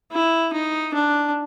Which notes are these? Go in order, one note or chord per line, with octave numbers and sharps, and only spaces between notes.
E4
D#4
D4